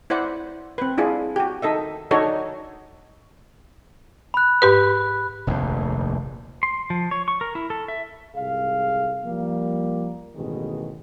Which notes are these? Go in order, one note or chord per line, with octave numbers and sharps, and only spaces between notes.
E4 C5 D5 F#5
C4 B4
D4 E4 F4 G#4
F#4 G4
D#4 A4 D#5 E5
D4 D#4 F#4 A4 C#5
B5 F#6
G#2 G4 B4
F1 A#1 D#2 G#2
C6
F3
C#5
C#6
A#4
E4
A4
E5
C2 G#2 G#4 F5
F3 G3 A#3
A1 G2 B2 D#3 G#3